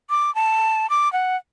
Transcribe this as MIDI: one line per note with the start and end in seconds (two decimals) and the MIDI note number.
0.10 0.33 86
0.35 0.89 81
0.90 1.11 86
1.13 1.36 78